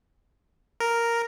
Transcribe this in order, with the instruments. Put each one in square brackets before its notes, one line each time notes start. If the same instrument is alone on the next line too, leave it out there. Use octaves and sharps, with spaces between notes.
[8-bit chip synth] A#4